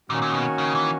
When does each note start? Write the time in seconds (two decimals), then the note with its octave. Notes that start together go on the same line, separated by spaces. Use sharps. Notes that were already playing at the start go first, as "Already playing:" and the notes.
0.09 A#2 D#3 A#3 C#4 F#4
0.22 A#2
0.34 B2
0.58 C#3
0.75 E3